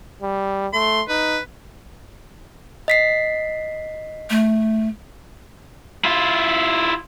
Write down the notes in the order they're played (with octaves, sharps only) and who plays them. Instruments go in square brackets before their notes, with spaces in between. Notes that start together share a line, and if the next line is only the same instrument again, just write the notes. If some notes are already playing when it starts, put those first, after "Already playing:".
[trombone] G3
[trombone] A3 [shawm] C6
[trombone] D#4 [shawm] B4
[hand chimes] D#5 B6 C7
[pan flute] A3
[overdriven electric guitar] E4 F4